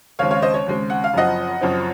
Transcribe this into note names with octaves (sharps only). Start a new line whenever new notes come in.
D#2 C#3 G#3 C4 C#5 F5
C#5 F5
C5 D#5
C#5
D#2 C#3 G#3 C4
F#5
F5
F#1 F#2 F3 C4 D#5 F#5
F#1 F#2 F3 C4